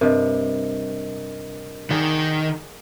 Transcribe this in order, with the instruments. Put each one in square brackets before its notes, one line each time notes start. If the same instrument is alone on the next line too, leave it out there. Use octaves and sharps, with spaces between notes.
[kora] G2 C3 [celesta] A#4 D#5
[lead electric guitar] D#3 [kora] G#4 D5 F#5